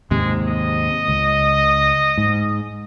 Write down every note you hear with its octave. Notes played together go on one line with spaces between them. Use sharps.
D#2 G#2 C3 G#3
D#5
C#2
G#2